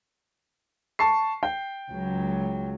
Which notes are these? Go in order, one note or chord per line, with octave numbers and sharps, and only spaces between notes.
A5 C#6 C7
G5
C#2 F#3